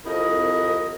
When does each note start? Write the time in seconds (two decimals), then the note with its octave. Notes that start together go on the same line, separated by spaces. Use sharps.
0.05 C2 F2 E4 A#4 D#5